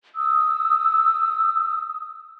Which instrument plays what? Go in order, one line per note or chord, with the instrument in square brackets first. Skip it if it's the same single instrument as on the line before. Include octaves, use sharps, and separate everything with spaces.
[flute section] D#6 E6